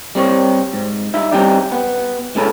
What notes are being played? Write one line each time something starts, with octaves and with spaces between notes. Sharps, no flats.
G3 C4 C#5
G#2
G3 D#4 E5
G3 C4 C#4 D#4 G4 D5
B3
A2 G#3 C#4 A4 B5